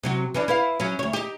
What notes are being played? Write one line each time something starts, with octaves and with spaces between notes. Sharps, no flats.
C3 F#3 F#4
E3 C#4 D4
E4 B4 F5
F#3 C#4
D2 C#5
D#4 G4